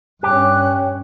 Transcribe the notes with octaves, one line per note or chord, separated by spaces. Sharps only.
G2 C#4 G4 F#6